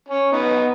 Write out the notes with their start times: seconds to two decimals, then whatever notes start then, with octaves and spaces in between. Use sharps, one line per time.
0.09 C#4
0.32 B3 D#4